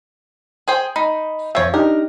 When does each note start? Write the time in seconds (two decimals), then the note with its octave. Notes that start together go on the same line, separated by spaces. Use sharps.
0.68 G#4 C5 G5
0.96 D#4 B5
1.55 F2 F3 C#5 E5
1.74 D4 D#4 G4 A#4